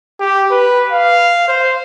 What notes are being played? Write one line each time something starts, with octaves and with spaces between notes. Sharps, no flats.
G4
B4
F5
C5